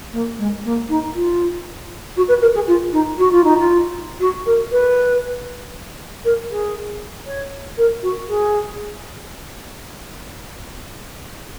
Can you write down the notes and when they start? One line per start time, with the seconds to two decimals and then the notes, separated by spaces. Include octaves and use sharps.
0.12 A#3
0.37 G#3
0.64 A#3
0.89 D#4
1.14 F4
2.16 F#4
2.28 B4
2.41 A#4
2.54 G#4
2.67 F4
2.92 D#4
3.18 F#4
3.31 F4
3.44 D#4
3.58 F4
4.19 F#4
4.46 A#4
4.71 B4
6.24 A#4
6.49 G#4
7.26 C#5
7.77 A#4
8.02 F#4
8.28 G#4